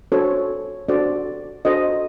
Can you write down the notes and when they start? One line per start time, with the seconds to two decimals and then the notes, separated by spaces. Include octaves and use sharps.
0.12 D4 F#4 A4 C5 C#5
0.88 D4 F#4 A4 C5 D5
1.65 D4 F#4 A4 C5 D#5